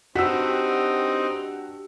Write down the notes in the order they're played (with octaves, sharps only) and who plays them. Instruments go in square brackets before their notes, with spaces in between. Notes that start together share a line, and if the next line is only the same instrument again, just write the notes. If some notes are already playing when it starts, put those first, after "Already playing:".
[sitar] G2 [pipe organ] C4 D#4 [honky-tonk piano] F#4 [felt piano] E6 B6